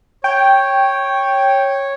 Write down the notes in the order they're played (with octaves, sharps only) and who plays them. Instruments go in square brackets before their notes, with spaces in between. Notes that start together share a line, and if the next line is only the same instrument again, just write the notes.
[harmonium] C#5 [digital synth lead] G5